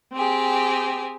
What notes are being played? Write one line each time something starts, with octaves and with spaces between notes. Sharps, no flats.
C4 G4 G#4